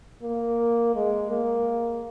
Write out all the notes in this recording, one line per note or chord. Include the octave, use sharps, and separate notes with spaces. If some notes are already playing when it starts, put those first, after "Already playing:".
A#3
G#3
A#3